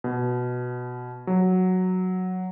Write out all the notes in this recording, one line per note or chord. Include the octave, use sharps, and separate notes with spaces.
B2
F#3